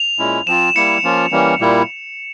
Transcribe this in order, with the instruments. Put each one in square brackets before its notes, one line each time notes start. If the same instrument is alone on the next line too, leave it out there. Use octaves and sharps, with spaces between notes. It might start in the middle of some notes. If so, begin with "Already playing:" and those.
Already playing: [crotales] F7
[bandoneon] A#2 G#3 C#4 E4
[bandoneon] F3 C4 F4 [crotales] E7
[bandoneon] G3 A#3 E4 [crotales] C#7
[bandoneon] F3 A#3 C#4 F4
E3 G3 A#3 C#4
A#2 G3 A#3 E4